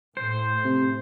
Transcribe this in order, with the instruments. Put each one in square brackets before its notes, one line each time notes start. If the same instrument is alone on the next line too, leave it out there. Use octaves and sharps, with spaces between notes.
[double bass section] A2 [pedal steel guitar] C5
[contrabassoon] C3